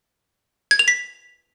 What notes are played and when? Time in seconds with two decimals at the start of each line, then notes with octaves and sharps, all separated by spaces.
0.71 G#6
0.79 F7
0.88 B6